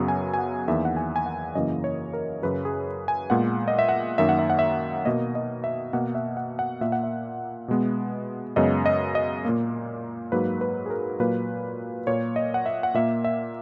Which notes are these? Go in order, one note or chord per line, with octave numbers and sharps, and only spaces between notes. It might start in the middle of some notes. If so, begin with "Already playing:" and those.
Already playing: F#2 C#3 F#3 B3
G#5
G#5
F#5
E2 D#3 A#3 E5
F#5
G#5
G#5
F#5
F#2 C#3 E3 A#3 D#5
C#5
A#4
F#2 C#3 F#3 B4
G#4
G#5
A#2 G#3 B3 F#5
D#5
E5
F#5
F#2 D#3 A#3 E5
F#5
E5
F#5
E5
B2 A#3 D#5
D#5
E5
B2 A#3 F#5
E5
F#5
F#5
A#2 A#3 E5
F#5
E5
B2 G#3 B3
F#2 C#3 G#3 B3 D#5
D#5
D#5
A#2 A#3
G#2 F#3 A#3 B4
B4
G#4
A#4
A#2 F#3 A#3 B4
A#2 A#3 C#5
D#5
F#5
E5
F#5
A#2 A#3 E5
E5